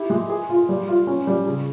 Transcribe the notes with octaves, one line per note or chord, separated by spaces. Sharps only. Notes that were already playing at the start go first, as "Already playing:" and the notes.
Already playing: E4 G4
G#3
G#4
F4
G3
F4
C#4
G3
C#3